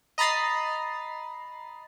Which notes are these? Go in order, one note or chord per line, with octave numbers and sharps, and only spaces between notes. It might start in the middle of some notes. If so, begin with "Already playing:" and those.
D#5 A#5 B5 A6 C7